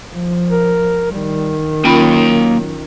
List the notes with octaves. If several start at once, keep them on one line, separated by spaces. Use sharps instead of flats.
F3
A#4
D#3 G3
F#3 A#3 C#4 F4 G5 B5